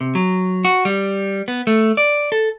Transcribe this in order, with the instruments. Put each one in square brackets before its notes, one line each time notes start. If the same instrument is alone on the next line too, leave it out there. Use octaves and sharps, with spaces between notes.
[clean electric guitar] C3
F#3
F#4
G3
B3
A3
D5
A4